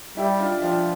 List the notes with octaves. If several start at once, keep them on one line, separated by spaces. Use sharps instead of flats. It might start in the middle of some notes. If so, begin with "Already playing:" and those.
G3 E4 G4
D4 F4
F3 D4 F4